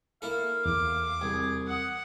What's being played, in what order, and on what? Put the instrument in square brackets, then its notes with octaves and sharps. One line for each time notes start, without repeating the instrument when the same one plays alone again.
[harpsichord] A#3 E4 A4 [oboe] F5
[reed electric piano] E2 [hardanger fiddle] D6
[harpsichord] C2 [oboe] G#4
[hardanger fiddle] F#5 [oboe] D#6